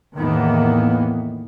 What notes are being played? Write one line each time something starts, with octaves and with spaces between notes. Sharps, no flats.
E2 A2 D#3 E3 A#3 B3